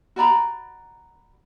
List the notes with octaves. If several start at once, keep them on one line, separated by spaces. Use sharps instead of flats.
F#4 D5 A#5 B5